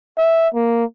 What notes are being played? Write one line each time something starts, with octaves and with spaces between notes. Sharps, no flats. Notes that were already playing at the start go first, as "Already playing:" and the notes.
E5
A#3